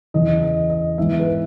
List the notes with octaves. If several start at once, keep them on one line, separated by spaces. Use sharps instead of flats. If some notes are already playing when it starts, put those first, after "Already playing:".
E2 C#3 E3 D#5
D#5
D#5
G#2 E3 B3 E5
B4